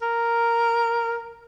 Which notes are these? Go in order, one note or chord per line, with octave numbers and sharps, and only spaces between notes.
A#4